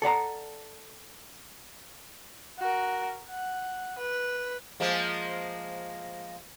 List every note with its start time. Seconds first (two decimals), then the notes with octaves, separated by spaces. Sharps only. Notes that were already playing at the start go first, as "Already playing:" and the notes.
0.02 A4 D5 F#5 A#5
2.59 F#4 A#4
3.29 F#5
3.98 B4
4.80 F3 G#3 A#3